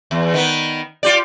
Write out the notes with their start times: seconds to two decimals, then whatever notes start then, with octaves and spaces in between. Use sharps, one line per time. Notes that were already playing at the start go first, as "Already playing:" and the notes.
0.11 E2
0.34 D#3 B3
1.03 F4 G4 D5